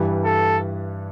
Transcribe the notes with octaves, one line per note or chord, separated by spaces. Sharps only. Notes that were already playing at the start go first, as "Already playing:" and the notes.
Already playing: G2 E3 G3
A4